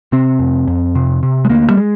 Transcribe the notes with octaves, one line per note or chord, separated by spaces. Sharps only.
C3 C4
F2
F2
C3
C3
G#3
D2 A#3
G3
G#3